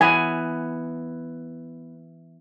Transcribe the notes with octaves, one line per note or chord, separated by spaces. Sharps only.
E3 B3 G#5